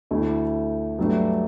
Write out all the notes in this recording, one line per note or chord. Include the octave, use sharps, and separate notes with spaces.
D2 D3 A3 E4
G2 F#3 A3 D4